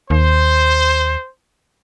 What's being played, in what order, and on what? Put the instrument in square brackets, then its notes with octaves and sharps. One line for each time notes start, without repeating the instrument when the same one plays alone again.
[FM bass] D#2 [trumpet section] C5